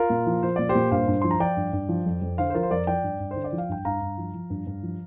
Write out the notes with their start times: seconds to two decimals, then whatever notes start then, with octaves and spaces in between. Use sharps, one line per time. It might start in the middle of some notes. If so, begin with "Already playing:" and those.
Already playing: F4 A#4
0.10 A#2
0.26 F3
0.42 F3 C5
0.56 A#2 D5
0.69 G4 C5
0.75 A#2
0.91 G2 C5 F5
1.08 G2
1.22 F3 C6
1.31 A#5
1.40 F3 D5 G5
1.57 G2
1.73 G2
1.89 F3
2.06 F2
2.22 F2
2.38 D3 C5 F5
2.50 C5
2.54 F3 F4 A#4
2.63 C5
2.71 F2 A#4 D5
2.87 F3 D5 G5
3.03 G2
3.20 G2
3.31 D3 C5
3.44 D5
3.52 F3
3.58 F5
3.69 G2 G5
3.85 G2 F5 A#5
4.01 G2
4.18 F3
4.34 F3
4.50 G2
4.67 G2
4.83 F3